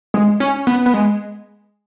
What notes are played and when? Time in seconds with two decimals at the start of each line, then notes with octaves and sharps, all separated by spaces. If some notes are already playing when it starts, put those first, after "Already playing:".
0.14 G#3
0.40 C#4
0.67 B3
0.86 B3
0.94 G#3